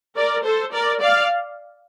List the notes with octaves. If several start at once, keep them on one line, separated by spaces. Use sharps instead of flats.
A#4 D5
A4 C5
A#4 D5
D5 F5